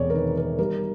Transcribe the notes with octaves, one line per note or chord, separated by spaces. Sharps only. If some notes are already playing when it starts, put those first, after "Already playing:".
Already playing: E1 C3 C#5 D5
A#4
D#3 B4
A#4
G3 A#4